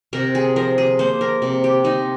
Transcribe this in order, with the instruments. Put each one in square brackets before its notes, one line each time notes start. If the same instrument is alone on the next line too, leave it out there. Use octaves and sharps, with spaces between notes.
[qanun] C3 A#4
G#4
F3 A#4
G#4
A#3 C5
A#4
C3
G4
C3 D#4